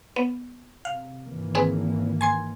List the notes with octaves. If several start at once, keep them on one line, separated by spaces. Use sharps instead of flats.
B3
C3 F5
G#1 E3 A#3
C4 G#4 B4
G#5 C6 G#6